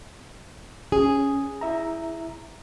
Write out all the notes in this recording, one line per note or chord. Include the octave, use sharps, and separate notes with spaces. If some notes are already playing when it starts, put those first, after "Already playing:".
C#4 G#4
E4 E5 A#5